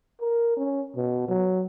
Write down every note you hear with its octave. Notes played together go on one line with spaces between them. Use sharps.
A#4
C#4
B2
F#3